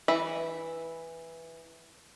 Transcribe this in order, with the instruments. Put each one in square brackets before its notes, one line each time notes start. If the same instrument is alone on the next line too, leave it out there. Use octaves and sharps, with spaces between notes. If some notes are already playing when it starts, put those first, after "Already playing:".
[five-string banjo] E3 E5 B5